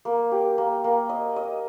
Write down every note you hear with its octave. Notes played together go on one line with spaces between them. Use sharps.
A#3
G4
A#3
A#3
D#5
D#5